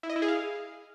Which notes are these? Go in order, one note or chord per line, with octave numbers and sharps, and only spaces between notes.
E4
D#5
E4
G#4
F5